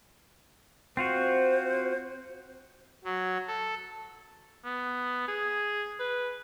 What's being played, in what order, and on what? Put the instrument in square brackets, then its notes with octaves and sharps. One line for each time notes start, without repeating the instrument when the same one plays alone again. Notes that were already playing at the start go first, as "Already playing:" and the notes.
[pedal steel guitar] C4 F4 F#4 [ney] C5
[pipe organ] F#3
A4
[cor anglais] B3
G#4
B4